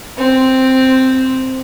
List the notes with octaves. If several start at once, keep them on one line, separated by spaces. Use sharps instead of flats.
C4